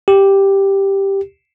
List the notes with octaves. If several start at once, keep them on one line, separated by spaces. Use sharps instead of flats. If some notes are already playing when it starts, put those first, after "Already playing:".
G4